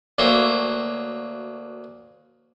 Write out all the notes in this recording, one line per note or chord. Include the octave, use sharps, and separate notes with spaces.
D2 F#3 A#3 C5 C#5 E5